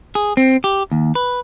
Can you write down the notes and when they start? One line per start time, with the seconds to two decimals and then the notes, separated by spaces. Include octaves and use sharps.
0.15 G#4
0.37 C4
0.64 G4
0.92 D#2
1.15 B4